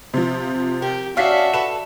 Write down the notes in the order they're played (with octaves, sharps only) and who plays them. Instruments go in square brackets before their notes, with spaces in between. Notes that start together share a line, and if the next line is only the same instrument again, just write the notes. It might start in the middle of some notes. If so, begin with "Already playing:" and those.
[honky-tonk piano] C3 F3
[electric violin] G4 [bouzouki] A#4
[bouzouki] C#4 D4 [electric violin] F#4 E5 [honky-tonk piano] F5 B6 C7
[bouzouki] A4 B4 [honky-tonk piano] E7